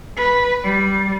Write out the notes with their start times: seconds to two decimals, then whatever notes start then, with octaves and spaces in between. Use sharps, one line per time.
0.17 B4
0.64 G3